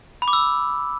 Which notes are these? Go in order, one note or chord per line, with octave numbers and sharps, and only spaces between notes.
B5
D6
E6